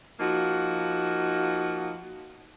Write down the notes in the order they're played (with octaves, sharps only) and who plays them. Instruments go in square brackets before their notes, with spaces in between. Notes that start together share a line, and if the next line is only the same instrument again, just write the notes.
[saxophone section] F3 A#3 D#4 F#4